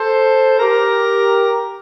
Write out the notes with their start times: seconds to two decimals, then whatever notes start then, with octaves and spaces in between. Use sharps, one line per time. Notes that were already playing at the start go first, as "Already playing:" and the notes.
Already playing: A4 C5
0.59 G4 A#4